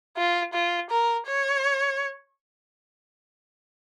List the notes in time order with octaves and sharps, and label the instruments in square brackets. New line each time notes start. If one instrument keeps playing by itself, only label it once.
[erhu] F4
F4
A#4
C#5